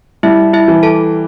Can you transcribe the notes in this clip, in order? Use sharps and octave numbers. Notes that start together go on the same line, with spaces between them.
G3 E4 E5
E4 E5
E3
A4 A5